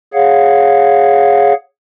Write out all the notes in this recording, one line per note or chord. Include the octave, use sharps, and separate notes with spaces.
G#4 C#5 F5 F#5